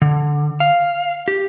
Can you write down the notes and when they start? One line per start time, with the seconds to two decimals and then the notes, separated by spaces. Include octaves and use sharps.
0.02 D3
0.60 F5
1.28 G4